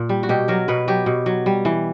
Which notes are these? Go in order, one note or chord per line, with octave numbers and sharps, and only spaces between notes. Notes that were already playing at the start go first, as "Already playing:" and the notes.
Already playing: A#2
G3
F#4
B2 G4
F#3 A#4
B2 B4
F#3 G4
B2
F#3
G3
E3